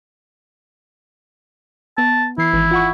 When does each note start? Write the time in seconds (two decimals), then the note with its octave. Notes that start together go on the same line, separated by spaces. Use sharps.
1.98 B3 A5
2.38 E3 E4 C7
2.53 G#1 E3
2.71 F4 F#5 C#6